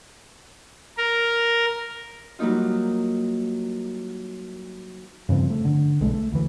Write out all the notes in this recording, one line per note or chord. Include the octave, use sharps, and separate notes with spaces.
A#4
F#3 G3 A#3 D#4 F4
G2 C#3 F3 C4
A3
D3
B1 G#3 A3
A3
D2 E3